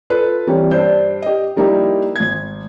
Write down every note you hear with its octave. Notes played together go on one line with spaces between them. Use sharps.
F4 A4 B4
E3 G3 A#3 C4 C#4
G2 D4 C5 G6
G4 D#5
F3 G3 A#3 D#4 E4 G4
G#1 G#6